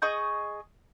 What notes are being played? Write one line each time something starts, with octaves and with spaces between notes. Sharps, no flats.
G#4 D#5 C#6 G6